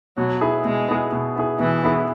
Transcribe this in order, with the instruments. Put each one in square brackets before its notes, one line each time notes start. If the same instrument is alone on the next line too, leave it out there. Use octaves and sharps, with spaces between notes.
[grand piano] B2 [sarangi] F#3
[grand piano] B3 E4 G#4
[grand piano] B2 [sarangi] G#3
[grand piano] B3 E4 G#4
B2
B3 E4 G#4
[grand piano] B2 [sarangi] E3
[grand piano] B3 E4 G#4